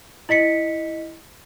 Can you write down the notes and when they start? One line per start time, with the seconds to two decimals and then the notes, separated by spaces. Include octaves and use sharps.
0.29 E4 D#5 B6 C#7